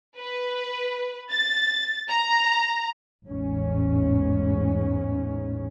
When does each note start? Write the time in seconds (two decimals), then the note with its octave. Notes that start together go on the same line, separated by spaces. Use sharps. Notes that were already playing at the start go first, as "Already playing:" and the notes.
0.17 B4
1.31 A6
2.09 A#5
3.28 A1 E2 G#2 C#4